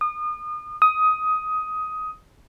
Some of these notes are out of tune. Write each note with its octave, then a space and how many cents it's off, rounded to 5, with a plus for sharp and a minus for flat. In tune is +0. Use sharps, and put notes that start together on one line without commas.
D#6 -35
D#6 +15